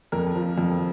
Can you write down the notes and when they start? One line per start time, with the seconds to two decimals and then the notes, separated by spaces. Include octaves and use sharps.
0.12 F2 A#4
0.35 F3
0.58 F2